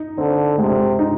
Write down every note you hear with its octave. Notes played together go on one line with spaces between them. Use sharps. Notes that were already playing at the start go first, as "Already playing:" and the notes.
Already playing: D#4
D3 C4
C3 G#3
D#4